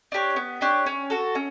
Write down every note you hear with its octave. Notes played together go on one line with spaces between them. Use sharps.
D4 G4 C#5
B3
D4 G4 C#5
C#4
F#4 A4
C#4